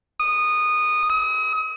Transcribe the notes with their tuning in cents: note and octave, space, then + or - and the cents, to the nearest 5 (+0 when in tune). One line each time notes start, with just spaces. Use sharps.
D#6 -15
D#6 +40